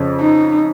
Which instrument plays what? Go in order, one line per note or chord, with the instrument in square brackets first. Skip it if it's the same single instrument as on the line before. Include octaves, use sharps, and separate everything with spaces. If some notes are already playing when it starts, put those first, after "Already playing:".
Already playing: [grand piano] F2 C#3
[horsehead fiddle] D#4